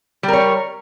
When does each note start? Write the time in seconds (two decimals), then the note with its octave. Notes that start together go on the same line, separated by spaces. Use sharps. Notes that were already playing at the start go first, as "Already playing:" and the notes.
0.23 G3
0.28 A#4
0.33 C#5